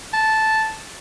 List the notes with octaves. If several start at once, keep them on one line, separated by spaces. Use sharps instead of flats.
A5